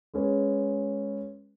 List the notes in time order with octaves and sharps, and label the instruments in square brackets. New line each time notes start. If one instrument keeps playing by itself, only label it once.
[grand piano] G#3 C#4 B4